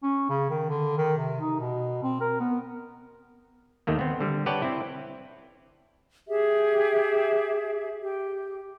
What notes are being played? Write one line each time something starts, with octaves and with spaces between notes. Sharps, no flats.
C#4
C#3
D#3
D3
D#3
C3
D#4
B2
C4
A#4
B3
D#2 D#3 A3 A#3
B3 C4
D3 G3
B4 C#5 D5 F#5 G5 A5
C4 E4
G4 G#4 E5
G4